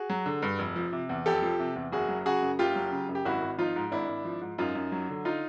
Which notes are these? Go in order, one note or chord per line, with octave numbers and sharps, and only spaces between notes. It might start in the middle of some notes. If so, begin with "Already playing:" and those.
Already playing: F#4 G#4
F#3
D3
G2
F1
F3
C3
E2
F1 G4 A4
F3
C3
E2
F#1 F#4 G#4
F#3
C#3 F#4 G#4
F#2
F#1 F4 G4
F#3
C#3
F#2
G4
G#1 E4 F#4
G#1
F3 D#4 F4
G#2
G#1 D4 E4
G#1
F3
G#2
F#2 D#4 F4
F#2
F#3
D3
D#4 F4